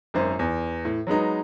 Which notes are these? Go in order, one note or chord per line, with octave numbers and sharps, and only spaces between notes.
G#1 F#2 C5
E2
A2
F#3 G#3 B3 D#4